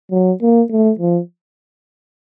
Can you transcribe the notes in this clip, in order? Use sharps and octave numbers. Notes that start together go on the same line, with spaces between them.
F#3
A#3
A3
F3